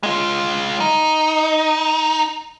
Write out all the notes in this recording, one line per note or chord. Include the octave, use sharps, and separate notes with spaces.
G#3 F4
D#4